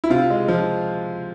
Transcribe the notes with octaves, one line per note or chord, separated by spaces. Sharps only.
E4
C3 F4
G#3
F3